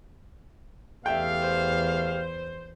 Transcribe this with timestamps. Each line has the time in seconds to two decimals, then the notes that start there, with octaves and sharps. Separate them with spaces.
1.06 E2 A3 G4 E5 F5 G5
1.43 C5